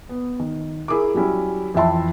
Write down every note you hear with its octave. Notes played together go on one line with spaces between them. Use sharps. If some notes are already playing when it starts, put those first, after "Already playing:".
B3
D#3
E4 G#4 A#4 D6
F#3 G3 C#4 E4
F2 E3 E4 E5 A5 C6